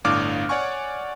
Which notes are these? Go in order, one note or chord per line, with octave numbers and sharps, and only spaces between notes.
G1 A2 D4 F5 D6 F6
C#5 D5 F#5 G#5 C#6